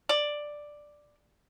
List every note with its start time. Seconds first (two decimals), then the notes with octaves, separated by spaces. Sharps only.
0.09 D5